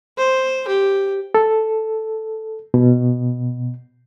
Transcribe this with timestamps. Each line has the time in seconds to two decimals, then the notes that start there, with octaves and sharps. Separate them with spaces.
0.18 C5
0.68 G4
1.35 A4
2.74 B2